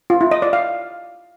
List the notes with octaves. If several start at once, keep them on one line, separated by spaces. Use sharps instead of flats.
F4
E4
D#5
D5
F5